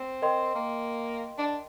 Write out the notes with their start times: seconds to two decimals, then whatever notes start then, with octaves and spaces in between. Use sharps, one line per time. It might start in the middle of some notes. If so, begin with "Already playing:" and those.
Already playing: C4
0.22 A#4 D#5 G5 C6
0.55 A#3
1.38 D4